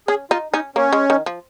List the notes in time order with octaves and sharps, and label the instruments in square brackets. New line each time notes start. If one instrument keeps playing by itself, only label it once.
[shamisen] C#4 [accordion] G#4
[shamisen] D#4 [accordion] F4
[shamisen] C#4 [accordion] D#4
[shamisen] A#3 [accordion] C#4
[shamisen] G#3
D#3
F3